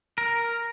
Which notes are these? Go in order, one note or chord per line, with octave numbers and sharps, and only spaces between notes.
A#4